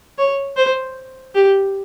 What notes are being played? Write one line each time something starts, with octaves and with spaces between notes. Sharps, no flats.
C#5
C5
G4